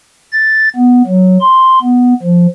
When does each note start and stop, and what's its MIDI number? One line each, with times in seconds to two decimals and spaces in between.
0.32 0.69 93
0.76 1.02 59
1.07 1.37 54
1.41 1.79 84
1.82 2.13 59
2.23 2.46 53